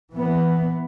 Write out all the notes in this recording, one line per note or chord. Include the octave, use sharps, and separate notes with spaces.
E3 B3